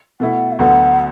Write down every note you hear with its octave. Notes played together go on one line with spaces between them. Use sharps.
B2 A3 E4 F#5
E5
D2 D3 F#3 B3 F#5